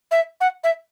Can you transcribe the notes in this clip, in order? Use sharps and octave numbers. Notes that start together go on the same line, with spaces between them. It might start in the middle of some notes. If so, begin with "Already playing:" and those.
E5
F#5
E5